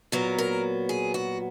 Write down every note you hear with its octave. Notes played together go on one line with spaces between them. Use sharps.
A#2 F#3 B3 A#4
A#4
G#4
F#4